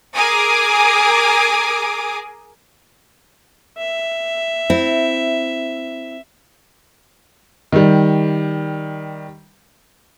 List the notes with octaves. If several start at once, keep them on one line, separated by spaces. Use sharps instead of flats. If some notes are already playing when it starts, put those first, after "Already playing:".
G#4 A#4 G#5 D6 D#6
E5
C4 E4
D#3 G3